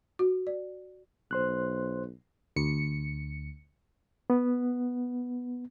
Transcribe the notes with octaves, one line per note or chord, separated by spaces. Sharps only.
F#4
D5
B1 C5 C6 F#6
D2 C#7
B3